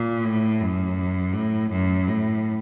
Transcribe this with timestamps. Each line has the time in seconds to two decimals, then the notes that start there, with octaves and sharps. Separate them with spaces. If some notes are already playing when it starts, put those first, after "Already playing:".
Already playing: A#2
0.24 A2
0.60 F#2
1.34 A2
1.71 F#2
2.08 A2